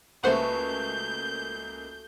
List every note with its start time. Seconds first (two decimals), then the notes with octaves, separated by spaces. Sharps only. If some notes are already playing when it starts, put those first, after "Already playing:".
0.24 C#2 A3 A#3 F#4 B4 C5 F#5 G6